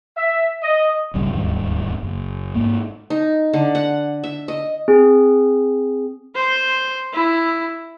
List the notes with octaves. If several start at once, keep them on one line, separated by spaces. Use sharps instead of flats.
E5
D#5
D1 G#1 C#3 G3
D1 D#2 G#2 G3
F#1
G#2 A#3
D#4
D3
F#5
E5
D#5
C4 G#4
C5
E4